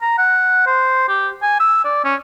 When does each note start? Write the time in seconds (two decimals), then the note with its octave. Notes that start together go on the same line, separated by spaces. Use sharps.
0.02 A#5
0.18 F#5
0.66 C5
1.08 G4
1.42 G#5
1.60 E6
1.84 D5
2.04 C#4